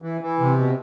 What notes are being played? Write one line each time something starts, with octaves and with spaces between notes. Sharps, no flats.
E3
E3
C3
B2